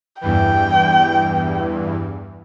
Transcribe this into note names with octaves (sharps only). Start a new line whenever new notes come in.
E2 G2 E3 G5